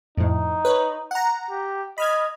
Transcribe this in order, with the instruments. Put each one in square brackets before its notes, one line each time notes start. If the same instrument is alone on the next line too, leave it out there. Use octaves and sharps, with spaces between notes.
[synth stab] F2 A2 [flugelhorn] D#4
[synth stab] B4 C#5
F#5 A#5
[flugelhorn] G4
[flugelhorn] D#5 [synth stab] B5 F6 G#6